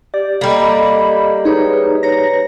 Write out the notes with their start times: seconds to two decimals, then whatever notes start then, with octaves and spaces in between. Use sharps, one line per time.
0.14 G4 D5
0.41 G3 A#3 A4 D#5 B5
1.45 D#4 G#4 B4 C#5
2.03 B4 C#5 A#5 A#6